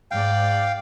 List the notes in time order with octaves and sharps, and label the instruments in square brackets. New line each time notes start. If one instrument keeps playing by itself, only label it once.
[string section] G#2 D5 [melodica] F5 G5